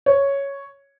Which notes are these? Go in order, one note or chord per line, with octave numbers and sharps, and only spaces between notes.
C#5